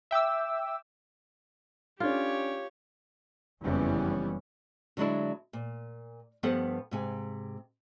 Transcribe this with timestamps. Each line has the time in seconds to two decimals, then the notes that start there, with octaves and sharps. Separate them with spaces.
0.11 E5 G5 D6 E6
2.00 C#4 D4 F4 G4 A4 C#5
3.62 F#1 F2 E3 G3 B3 C#4
4.97 D3 F#3 G#3 D4 E4
5.53 A#2
6.43 G2 F3 B3 G4 A4 F#5
6.91 G#2 C3 G#5